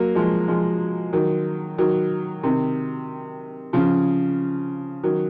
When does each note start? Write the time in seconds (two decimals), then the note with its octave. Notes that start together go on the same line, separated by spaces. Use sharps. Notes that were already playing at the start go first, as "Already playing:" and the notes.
Already playing: F#3 A#3
0.15 F3 G#3
0.48 F3 G#3
1.13 D#3 F#3
1.78 D#3 F#3
2.43 C3 D#3
3.73 C#3 F3
5.03 D#3 F#3